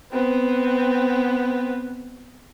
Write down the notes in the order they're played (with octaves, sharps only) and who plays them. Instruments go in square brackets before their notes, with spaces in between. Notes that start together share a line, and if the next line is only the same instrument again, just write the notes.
[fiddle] B3 C4